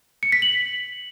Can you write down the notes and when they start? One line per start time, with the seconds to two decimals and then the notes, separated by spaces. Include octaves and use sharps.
0.23 C#7
0.32 B6
0.42 F#7